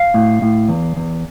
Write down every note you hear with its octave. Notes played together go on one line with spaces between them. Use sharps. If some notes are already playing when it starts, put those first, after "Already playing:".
Already playing: F5
A2
A2
E2
E2